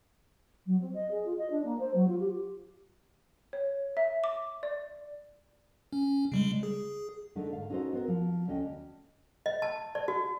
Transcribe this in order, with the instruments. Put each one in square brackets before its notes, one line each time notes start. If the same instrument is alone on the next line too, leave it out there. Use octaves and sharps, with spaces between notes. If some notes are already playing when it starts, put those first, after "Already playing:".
[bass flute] F#3
C4
D#5
G#4
F4
D#5
D4
A#3
C5
F#3
F4
G4
[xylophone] C#5
E5
D6
D5
[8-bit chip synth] C#4
C#3 G3 G#3
G#4
[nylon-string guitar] D3 A3 D#4 A4
G#2 F5
C#4 D#4 F#4 G#4 A4 C5
B3 C4 A#4
F3
D2 C#4 D#5 G5
[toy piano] D#5
A5
D5
F#4